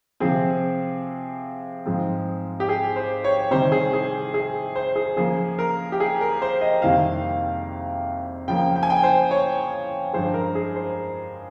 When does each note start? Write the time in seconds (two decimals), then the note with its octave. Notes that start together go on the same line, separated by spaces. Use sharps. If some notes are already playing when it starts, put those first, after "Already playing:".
0.20 C3 F3 C4 G#4
1.86 G#2 F3 G#3 C4
2.60 G4
2.69 G#4
2.96 C5
3.24 C#5
3.51 C3 D#3 G3 C5
3.72 G#4
3.93 G#4
4.34 G#4
4.76 C5
4.96 G#4
5.16 C#3 F3 A#3 G#4
5.59 A#4
5.92 G4
6.00 G#4
6.21 A#4
6.42 C5
6.61 D#5
6.82 F2 C3 D#3 G3 A#3 F5
8.48 C#3 F3 A#3 G5
8.76 G5
8.83 G#5
8.90 G5
9.03 C5
9.31 C#5
10.13 G2 F3 G#3 C5
10.34 A#4
10.55 G#4
10.76 C5